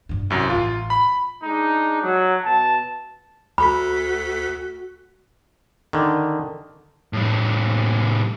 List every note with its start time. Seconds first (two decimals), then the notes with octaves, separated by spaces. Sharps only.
0.09 G2 D4
0.30 C2 F#2
0.50 A1 G3 F4
0.90 B5
1.43 G#3 D4 D#4
2.03 F#3
2.44 B2 A5
3.58 D2 F#4 A4 B5 B6
5.93 D3 D#3
7.13 A2 G3